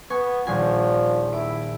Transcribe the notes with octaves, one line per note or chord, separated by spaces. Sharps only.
B3 G#5 C#6 G#6
D#1 A#1 F3 G#5
E4 D7